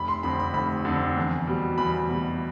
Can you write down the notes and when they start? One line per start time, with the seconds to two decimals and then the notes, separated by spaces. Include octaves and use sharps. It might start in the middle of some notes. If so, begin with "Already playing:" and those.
Already playing: F1 B5
0.08 C6
0.23 F2 D3 B5
0.39 B5
0.54 F1 B5
0.85 F2 D3
1.16 E2
1.47 B2 G3
1.78 E2 B5
2.09 B2 G3